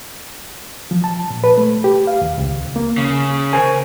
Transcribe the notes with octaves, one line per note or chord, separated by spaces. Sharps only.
F3
A5
A#2
B4
A3
G4
F5
D#2
C#2
D#2
A#3
C#3
A#4 C5 G#5